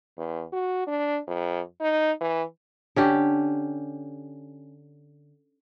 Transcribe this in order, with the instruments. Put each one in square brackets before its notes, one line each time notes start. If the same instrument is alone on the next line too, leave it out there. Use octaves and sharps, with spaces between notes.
[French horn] E2
F#4
D4
F2
D#4
E3
[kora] D3 C#4 G4